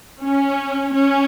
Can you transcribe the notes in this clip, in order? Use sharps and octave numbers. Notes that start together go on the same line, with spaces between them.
C#4
C#4